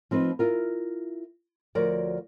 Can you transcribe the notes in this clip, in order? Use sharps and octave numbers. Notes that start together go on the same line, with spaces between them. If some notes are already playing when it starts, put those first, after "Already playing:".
F3 C4 D#4 B4
E4 F4 A#4
D2 F3 F#4 A#4 C#5 D5